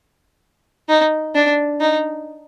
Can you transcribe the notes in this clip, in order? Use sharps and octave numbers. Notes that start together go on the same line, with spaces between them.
D#4
D4
D#4